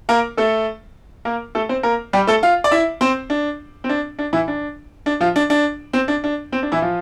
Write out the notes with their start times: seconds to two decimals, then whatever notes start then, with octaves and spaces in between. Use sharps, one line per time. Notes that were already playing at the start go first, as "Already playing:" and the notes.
0.09 A#3 A#4
0.37 A3 A4
1.25 A#3 A#4
1.55 A3 A4
1.69 C4 C5
1.83 A#3 A#4
2.13 G3 G4
2.27 A3 A4
2.43 F4 F5
2.64 D5
2.71 E4 E5
3.01 C4 C5
3.30 D4
3.84 C4
3.89 D4
4.19 D4
4.33 E3 E4
4.48 D4
5.06 D4
5.20 F3 F4
5.36 D4
5.50 D4
5.93 C4
6.08 D4
6.24 D4
6.52 C4
6.63 D4
6.72 E3 E4
6.82 F3 F4